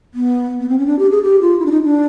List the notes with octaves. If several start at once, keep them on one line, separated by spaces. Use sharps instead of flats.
B3
B3
C4
C#4
D4
G4
G#4
G4
F4
E4
D4
D#4
D4